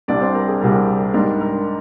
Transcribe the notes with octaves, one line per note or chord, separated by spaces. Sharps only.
C2 C3 G3 D4 D5
C4 C5
A#4
G#4
C2 C3 G3 A#4
G#2 G3 D4 A#4
A#4